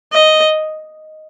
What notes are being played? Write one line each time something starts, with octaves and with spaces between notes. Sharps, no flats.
D#5